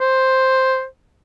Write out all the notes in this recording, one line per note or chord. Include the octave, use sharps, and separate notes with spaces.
C5